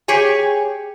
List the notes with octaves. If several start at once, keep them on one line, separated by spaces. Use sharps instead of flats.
G4 G#4 C#5 G#5